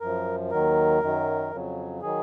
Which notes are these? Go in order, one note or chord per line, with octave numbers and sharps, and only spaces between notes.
F#2 F3 A#4
D#2 D#3 F#3 A#4
F#2 D#3 F#3
F2 C#3 F#3
D#3 F#3 G#4